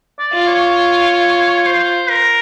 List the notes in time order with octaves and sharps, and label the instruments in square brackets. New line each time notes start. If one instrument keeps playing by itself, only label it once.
[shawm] D5
[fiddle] F4
[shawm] C#5
C5
A#4